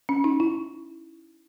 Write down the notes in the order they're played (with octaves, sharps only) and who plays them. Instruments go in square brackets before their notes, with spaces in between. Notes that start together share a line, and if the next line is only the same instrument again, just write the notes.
[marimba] C#4
D#4
E4